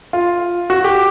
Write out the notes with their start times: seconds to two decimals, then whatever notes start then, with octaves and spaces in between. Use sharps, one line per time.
0.13 F4
0.70 F#4
0.84 G4